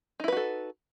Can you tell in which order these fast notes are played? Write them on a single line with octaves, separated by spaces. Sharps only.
D#4 E4 B4 F#4 A4